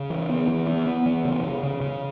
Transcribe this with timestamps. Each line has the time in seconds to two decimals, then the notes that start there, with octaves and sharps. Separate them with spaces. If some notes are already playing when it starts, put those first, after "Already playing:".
Already playing: C#3
0.10 E3
0.29 B3
0.48 E3
0.67 B3
0.86 B3
1.06 E3
1.25 C#3
1.44 C#3
1.63 C#3
1.81 C#3